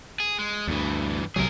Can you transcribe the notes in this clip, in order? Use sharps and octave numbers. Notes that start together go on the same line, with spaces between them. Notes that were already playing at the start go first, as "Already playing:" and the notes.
G#4
G#3
D2 G2 E3
B1 C3 F#3 G#4 A#4